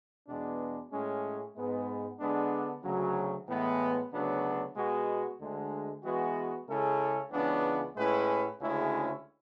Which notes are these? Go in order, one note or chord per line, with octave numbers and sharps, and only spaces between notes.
E2 B2 G#3 B3 D4
A2 G#3 C#4
G#2 G#3 B3
D3 G#3 B3 D4
D2 C#3 F#3
A2 E3 G#3 B3
D2 C#3 F#3 B3 D4
B2 G#3 B3 F#4
D2 D3 G#3
E3 G#3 B3 F#4
C#3 G#3 C#4 E4 A4
C#2 C#3 E3 B3 D4
A2 G#3 C#4 E4 B4
D2 C#3 G#3 C#4 E4